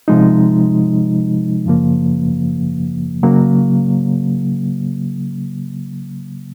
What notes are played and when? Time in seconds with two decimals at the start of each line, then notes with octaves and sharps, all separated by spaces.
0.08 C3 F3 G#3 D#4
1.66 F#2 C#3 F3 A#3
3.23 C#3 F#3 A#3